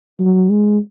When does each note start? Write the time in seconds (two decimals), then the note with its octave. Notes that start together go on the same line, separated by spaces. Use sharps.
0.20 F#3
0.50 G#3